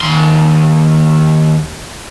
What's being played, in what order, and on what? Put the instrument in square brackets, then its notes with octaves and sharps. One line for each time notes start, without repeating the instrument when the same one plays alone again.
[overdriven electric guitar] D#2 C6